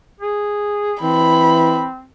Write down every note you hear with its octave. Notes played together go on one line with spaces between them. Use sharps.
G#4
E3 C4 B5